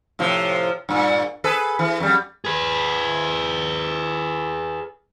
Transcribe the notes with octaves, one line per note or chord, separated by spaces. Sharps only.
A2 C3 F3
G2 A#2
G#4 A4 B4
E3
F2 G3
G#4 B4